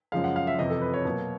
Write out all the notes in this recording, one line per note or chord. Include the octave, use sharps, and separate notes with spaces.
F#2 C#3 F3 G#3 F5
F#5
F5
E5
F2 C3 E3 D#5
A4
B4
C#5
B2 F#3 A#3